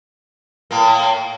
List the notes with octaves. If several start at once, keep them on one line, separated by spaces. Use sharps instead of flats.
A2 A#3